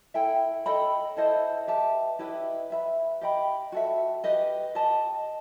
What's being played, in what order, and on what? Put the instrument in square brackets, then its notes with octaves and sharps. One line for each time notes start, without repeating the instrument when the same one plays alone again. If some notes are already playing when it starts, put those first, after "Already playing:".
[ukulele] E4 A4 E5 G5
A4 D#5 G5 B5
E4 A4 C5 D#5
G4 B4 E5 A5
E4 G4 B4 D#5
B4 E5 B5
G4 D#5 G5 B5
F#4 A4 E5
G4 B4 D#5
G4 D#5 A5